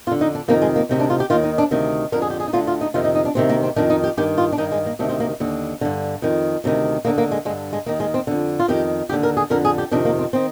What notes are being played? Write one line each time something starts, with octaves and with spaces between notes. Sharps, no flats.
F2 D3 F4
D#4
D4
F2 C3 D#3 A#3
G#3
A#3
D2 C3 D#3
D4
F4
G4
D#2 D#3 F4
D#4
D4
D2 C3 D#3
F2 D3 A#4
G#4
G4
G#4
D#4
D2 D3 F4
F4
D#4
F2 C3 D#3 F4
D#4
D#4
D4
D2 C3 D#3 C4
A#3
C4
F2 D#3 D4
D#4
G4
G2 D#3 G4
F4
D4
G2 D#3 D#4
G#3
A#3
D2 C3 D#3 D4
C4
A#3
D#2 D3
G2 D3
F2 D#3
D2 C3 D#3
D#2 D3 A#3
A#3
G#3
G2 D3 G#3
G#3
D#2 D#3 A#3
G#3
C4
F2 D3
F4
F2 D#3 G4
D#2 D3 G4
A#4
G#4
F2 D3 A#4
G#4
G4
F2 C3 D#3 D4
A#3
C4
D#3 C4